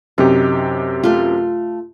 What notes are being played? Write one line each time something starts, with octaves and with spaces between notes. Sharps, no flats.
F#2 C3 D#4 G4
A3 F4